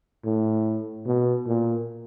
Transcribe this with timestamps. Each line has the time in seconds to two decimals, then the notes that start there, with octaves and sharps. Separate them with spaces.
0.25 A2
1.06 B2
1.47 A#2